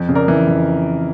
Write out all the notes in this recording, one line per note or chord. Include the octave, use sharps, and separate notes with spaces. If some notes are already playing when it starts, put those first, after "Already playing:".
Already playing: F2
C#3
A#4 D5
E3
F2